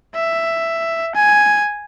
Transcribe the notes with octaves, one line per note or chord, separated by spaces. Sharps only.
E5
G#5